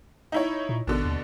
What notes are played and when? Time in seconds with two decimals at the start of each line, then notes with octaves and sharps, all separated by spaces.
0.32 D#4 E4 C#5
0.69 A#2
0.87 A1 B2 D3
1.05 D#2